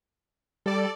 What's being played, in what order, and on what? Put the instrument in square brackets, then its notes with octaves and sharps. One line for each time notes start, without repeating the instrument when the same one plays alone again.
[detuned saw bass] G3 [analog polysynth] A4 D5